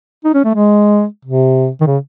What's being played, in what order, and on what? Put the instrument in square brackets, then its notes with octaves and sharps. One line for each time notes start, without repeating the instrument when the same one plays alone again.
[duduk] D#4
C#4
A3
G#3
C3
D#3
C#3